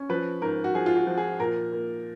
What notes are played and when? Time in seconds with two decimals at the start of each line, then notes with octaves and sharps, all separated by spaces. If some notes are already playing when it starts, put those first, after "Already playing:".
Already playing: C#4
0.09 F3 B4
0.42 G#2 A#4
0.64 F#4
0.74 F3 G#4
0.86 F4
0.96 F#4
1.07 F3
1.17 G#4
1.39 A#2 A#4
1.72 A#3